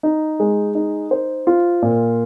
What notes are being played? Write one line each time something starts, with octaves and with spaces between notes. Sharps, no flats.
D#4
G#3
D#4
C5
F4
A#2